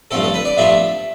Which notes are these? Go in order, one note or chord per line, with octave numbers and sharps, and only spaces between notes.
G2 F3 A3 C4 A4
A4
B4
D5
G2 F3 A3 C4 E5